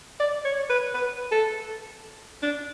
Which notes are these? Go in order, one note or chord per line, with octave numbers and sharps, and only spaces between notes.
D5
C#5
B4
B4
A4
D4